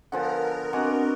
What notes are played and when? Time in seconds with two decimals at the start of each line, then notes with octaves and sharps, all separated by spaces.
0.12 D3 F3 B3 A#4 F#5 G#5 A5
0.73 C4 D4 F#4 D5 D#5 F#5 G#5